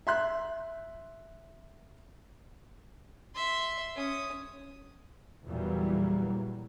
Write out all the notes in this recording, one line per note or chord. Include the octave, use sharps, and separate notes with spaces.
E5 C6 F#6
E5 C6
C#4 D#6
E2 A#2 E3 F#3 G3 A#3